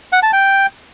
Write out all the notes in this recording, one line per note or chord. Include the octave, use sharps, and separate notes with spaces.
F#5
A5
G5